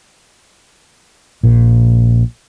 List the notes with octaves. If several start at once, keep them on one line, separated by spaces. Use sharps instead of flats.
A#1 A#2